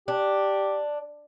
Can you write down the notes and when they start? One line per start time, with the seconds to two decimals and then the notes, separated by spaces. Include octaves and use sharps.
0.08 D4 G4